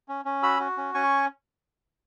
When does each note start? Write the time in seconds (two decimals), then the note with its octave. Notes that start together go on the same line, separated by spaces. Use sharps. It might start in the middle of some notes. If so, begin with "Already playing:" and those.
0.08 C#4
0.25 C#4
0.43 F#4 B5 E6
0.60 F#4
0.77 C#4
0.94 C#4 G#5 C#6